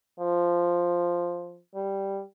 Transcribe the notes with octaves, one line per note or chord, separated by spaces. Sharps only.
F3
G3